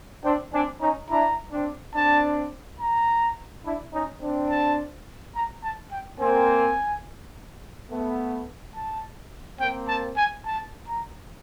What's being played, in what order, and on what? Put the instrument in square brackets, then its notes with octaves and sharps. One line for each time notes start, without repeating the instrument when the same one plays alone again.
[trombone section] C4 D4 [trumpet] G5
[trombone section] C4 D4 [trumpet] G#5
[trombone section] C#4 D#4 [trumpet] A#5
[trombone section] D4 E4 [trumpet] A#5
[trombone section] C4 D4
[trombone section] C4 D4 [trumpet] A5
[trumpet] A#5
[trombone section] D4 E4
C#4 D#4
C4 D4
[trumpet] A5
A#5
A5
G5
[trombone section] A#3 C4 [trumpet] G#5
[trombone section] A3 B3
[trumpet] A5
[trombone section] A#3 C4 [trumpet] G5
[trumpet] A5
G#5
A5
A#5